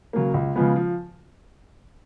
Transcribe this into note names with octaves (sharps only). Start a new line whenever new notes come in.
C#3 F#3 A#3
C#2
C#3 F3 G#3 B3
F3